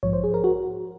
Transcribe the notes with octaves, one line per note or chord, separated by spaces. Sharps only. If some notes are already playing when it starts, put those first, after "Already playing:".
A#1 G#2 F3 C#5
C5
G#4
A#4
F#4